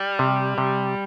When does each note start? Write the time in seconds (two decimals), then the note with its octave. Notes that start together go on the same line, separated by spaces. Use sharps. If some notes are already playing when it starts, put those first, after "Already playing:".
Already playing: G3
0.19 C3
0.58 C3